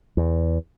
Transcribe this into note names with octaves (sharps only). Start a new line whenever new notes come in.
E2